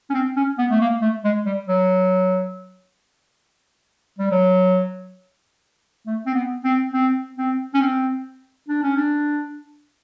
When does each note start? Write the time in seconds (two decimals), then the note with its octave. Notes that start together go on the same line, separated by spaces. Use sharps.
0.10 C#4
0.14 C4
0.36 C#4
0.58 B3
0.71 A3
0.81 A#3
1.02 A3
1.24 G#3
1.46 G3
1.68 F#3
4.19 G3
4.31 F#3
6.06 A3
6.26 C4
6.35 B3
6.64 C4
6.94 C4
7.37 C4
7.74 C#4
7.81 C4
8.69 D4
8.83 C#4
8.97 D4